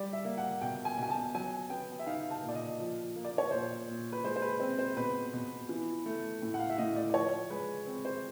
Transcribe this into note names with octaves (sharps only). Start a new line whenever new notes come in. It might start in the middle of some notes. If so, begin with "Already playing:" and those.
Already playing: G3 D5
E5
A#3
F#5
B2 G5
G#5
B2 G#5
A5
F#3 G#5
B3 G5
E5
D#4 F5
A5
A#2
D5
D#5
F3
A#3
D5
C#5
A#2 C5
A#2
B4
G#3 C5
C5
B4
C4 C5
C5
B2 B4
B2
E3
A3
A2
F#5
F5
E5
A2 D#5
D5
D5
F3 C#5
G#3 B4
C4
C5